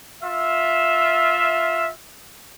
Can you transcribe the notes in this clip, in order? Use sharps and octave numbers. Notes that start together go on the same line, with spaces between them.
F4 E5